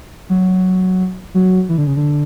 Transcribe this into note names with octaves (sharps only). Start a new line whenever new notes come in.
F#3
F#3
E3
D3
C#3
D3